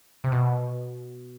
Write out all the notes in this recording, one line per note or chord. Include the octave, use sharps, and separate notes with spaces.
C3
B2